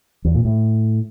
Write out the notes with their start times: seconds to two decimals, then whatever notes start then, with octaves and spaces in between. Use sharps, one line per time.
0.25 E2
0.35 A#2
0.45 A2